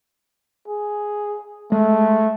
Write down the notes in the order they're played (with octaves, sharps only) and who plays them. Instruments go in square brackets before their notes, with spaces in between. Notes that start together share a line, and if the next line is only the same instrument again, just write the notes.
[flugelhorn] G#4
[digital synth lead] G#3 [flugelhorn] A3